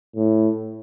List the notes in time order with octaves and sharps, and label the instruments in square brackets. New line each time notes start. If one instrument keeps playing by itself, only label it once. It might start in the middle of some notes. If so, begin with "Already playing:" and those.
[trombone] A2